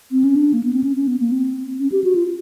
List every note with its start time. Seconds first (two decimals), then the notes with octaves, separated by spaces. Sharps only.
0.12 C4
0.24 C#4
0.36 D4
0.53 A#3
0.64 B3
0.73 C4
0.84 C#4
0.96 C#4
1.08 B3
1.20 A#3
1.32 C4
1.80 C#4
1.92 G4
2.04 F#4
2.15 F4